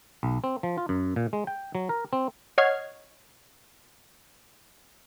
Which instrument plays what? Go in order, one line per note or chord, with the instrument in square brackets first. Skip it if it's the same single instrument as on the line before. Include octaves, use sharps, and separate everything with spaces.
[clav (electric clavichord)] B1
C4
F3
F4
F#2
A#2
G#3
G5
F#3
A#4
C4
[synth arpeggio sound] C#5 D#5 F#5 F6 G#6 C7